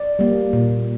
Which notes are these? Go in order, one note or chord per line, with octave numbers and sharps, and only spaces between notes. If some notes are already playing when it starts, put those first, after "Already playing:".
Already playing: D5
G3 A#3
A#2